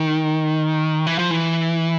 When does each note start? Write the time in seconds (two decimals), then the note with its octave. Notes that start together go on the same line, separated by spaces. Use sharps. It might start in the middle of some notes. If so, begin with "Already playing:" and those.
Already playing: D#3
1.07 E3
1.19 F3
1.31 E3